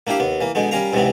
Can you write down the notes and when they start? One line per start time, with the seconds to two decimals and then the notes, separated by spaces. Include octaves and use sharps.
0.07 A#3 D4 E4 G4 F5
0.20 D#2 B3
0.41 E3 A#3
0.55 B2 D3 G#3 B3
0.71 G3 C#4 A#4 F5 A#5
0.93 C#2 G#2 C3 E3 B3 C4